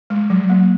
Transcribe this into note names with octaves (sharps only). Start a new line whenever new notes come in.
G#3
F#3
A#3